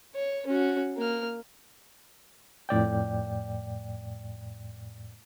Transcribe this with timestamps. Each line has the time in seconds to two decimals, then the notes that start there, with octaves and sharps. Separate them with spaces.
0.15 C#5
0.47 C#4 F#4
0.97 A#3 F6
2.69 F2 A2 D5 G5